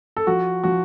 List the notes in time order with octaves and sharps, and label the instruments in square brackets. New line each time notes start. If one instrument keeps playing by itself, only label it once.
[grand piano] A4
F3 F#4
F3 F#4